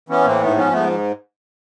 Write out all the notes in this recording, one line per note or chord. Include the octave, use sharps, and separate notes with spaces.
E3 B3 C#4
A2 A#3 C4
G#2 A3 B3
F3 B3 C#4
G#2 A3 B3